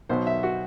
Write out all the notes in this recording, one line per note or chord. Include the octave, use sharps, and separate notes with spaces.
B1 B2 F#3 C5
E5
F#4